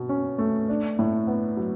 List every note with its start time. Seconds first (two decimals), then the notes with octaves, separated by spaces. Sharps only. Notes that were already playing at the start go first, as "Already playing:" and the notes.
Already playing: B2
0.09 C#4
0.38 A3
0.69 D4
0.99 A2
1.27 B3
1.57 F#3